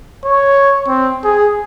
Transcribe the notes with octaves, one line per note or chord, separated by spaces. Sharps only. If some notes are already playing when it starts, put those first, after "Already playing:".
C#5
C4
G#4